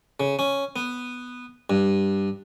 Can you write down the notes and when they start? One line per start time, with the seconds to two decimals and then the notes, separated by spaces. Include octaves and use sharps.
0.20 C#3
0.39 C#4
0.76 B3
1.70 G2